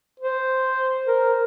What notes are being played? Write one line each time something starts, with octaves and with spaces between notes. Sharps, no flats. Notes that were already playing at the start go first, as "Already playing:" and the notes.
C5
A#4